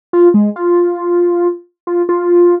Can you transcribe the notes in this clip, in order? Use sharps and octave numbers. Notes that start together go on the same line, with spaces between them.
F4
G#3
F4
F4
F4